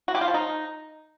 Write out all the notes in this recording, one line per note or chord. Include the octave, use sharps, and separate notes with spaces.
F#4
G4
F4
F3
D#4